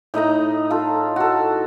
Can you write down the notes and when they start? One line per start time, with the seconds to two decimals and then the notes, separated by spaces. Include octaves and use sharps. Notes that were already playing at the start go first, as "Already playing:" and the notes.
0.14 A2 D#4 D#5 A#5
0.70 F4 A4
1.16 F#4 A4